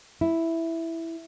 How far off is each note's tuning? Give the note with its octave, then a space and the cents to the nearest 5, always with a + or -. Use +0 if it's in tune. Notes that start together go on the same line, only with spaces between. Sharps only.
E4 +0